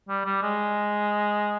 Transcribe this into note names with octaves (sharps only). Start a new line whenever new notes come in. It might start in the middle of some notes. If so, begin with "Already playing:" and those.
G3
G3
G#3